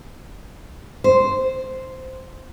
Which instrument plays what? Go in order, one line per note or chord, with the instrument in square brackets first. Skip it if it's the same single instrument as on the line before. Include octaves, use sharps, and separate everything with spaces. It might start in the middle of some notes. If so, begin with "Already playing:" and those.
[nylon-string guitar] C5